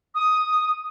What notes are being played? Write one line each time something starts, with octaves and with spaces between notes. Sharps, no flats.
D#6